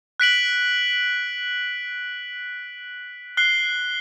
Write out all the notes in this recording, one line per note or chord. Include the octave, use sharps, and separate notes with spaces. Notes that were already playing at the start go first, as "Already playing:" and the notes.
F#6 B6 D7 F#7
F#6 C7 G7